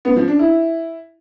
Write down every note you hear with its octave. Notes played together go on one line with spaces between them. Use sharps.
B3
F3
D4
E4